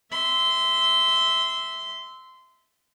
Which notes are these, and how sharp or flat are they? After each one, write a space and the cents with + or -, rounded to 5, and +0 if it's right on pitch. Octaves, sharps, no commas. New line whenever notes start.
E5 -10 C6 -20